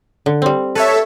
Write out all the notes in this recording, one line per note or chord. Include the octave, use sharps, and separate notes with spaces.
D3
G3 C4
A4 B4 C#5 E5